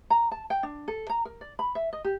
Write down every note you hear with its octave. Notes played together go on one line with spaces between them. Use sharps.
A#5
A5
G5
D4
A4
A#5
A#4
D5
B5
E5
D#5
G4